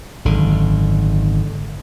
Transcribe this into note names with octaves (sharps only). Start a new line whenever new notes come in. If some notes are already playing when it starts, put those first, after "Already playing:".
G#1 F#2 D3